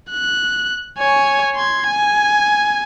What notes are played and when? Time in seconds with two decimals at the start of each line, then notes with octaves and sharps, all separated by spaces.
0.11 F#6
0.98 C#5 G#5
1.55 C6 G#6
1.87 G#5